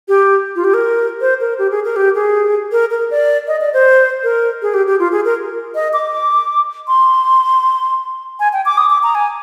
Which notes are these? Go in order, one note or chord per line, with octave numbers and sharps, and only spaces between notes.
G4
F4
G4
A#4
C5
A#4
G4
G#4
A#4
G4
G#4
A#4
A#4
D5
D#5
D5
C5
A#4
G#4
G4
G4
F4
G#4
A#4
D#5
D6
C6
G#5
G5
D6
D#6
D6
A#5
G#5